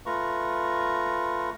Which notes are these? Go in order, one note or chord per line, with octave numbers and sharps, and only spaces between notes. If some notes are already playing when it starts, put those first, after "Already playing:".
A3 F4 B4 A#5 C#6